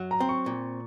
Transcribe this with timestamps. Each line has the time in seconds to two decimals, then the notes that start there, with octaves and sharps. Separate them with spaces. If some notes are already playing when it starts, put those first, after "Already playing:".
Already playing: F#2 F#3
0.11 A#5
0.20 C4
0.29 C#6
0.46 A#2